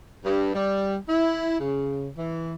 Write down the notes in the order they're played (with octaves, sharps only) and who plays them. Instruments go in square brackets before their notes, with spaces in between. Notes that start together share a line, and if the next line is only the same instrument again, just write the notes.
[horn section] G2
G3
E4
C#3
E3